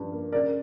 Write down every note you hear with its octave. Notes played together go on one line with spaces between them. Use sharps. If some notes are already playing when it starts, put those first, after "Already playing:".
Already playing: G2 F3
A#3
C#3 A#4 D5